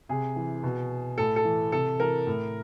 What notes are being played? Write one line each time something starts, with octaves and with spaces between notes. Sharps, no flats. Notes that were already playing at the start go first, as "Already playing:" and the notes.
C3 G#4
E3
B2
A2 A4
A4
E3
C3 A4
E3 A#4
A2